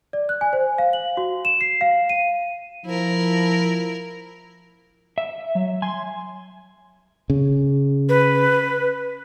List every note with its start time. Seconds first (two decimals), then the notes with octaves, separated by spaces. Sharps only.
0.13 D5
0.29 F#6
0.41 G#5
0.53 C5
0.78 F5
0.93 F#7
1.17 F#4
1.45 E7
1.61 C7
1.81 F5
2.09 D#7
2.86 F3 E4 A#4
5.18 E5
5.55 F#3
5.82 G#5 C6
7.30 C#3
8.09 B4